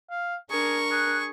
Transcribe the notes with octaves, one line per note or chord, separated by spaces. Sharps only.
F5
D4 G#4 A#4 C#6
G#4 F#6